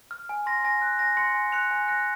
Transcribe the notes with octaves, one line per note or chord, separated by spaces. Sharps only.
F6
G#5
C6 A#6
G#5 A#6
F#6
G#5 A#6
C6 A#6 C#7
G#5
F#6 C#7 F7
G#5
F#6 A#6 C#7